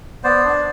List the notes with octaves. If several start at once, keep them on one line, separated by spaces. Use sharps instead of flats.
B3 C5 D5
D4